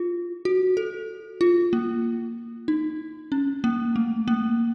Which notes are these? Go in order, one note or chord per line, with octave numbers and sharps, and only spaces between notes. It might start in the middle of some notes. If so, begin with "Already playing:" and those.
Already playing: F4
F#4
A4
F4
A#3
D#4
C#4
A#3
A3
A#3